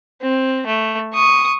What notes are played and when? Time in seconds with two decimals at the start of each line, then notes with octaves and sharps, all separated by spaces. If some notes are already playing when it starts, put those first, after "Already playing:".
0.21 C4
0.67 A3
1.13 C#6 D#6